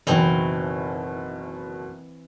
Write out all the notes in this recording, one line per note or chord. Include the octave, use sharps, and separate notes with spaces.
F#1 B2 D#3 E3 C4